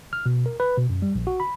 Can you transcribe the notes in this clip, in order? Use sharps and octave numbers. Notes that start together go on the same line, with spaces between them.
F6
B2
A#4
B4
B2
F#2
G3
A#1
F#4
B5